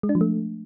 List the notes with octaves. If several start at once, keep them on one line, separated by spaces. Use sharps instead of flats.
G#3
D4
F3
A3